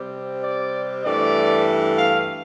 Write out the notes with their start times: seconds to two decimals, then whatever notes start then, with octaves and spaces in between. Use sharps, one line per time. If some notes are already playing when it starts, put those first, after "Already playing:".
Already playing: C3 G3 C4
0.44 D5
1.04 G2 E3 A3 D5
1.97 F5